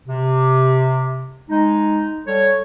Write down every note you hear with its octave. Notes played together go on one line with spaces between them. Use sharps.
C3
G#3 D#4
G3 A4 C#5